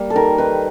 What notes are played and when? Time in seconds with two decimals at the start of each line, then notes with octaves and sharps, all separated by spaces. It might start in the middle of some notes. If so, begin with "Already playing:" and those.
Already playing: G3 A#3
0.10 A4
0.16 D#3 A#4
0.38 D#3 B4